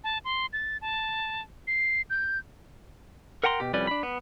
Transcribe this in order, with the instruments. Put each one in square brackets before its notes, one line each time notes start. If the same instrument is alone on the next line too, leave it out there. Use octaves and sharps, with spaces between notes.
[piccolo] A5
C6
A6
A5
C7
G6
[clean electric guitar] A#4 F#5 G5 A#5 C6
B2 G4
C2 F2 G3 C#4 B4 D5
D4 B5
B3